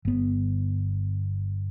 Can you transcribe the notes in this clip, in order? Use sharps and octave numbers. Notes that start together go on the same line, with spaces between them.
G1 B3